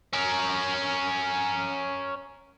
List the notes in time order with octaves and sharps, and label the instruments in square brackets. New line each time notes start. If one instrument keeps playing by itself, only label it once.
[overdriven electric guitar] C#4 A#4